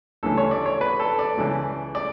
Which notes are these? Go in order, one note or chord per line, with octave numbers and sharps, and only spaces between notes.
D2 C#3 E3 A4
C#5
D5
C#5
B4
A4
D5
C#2 C#3 E3
D5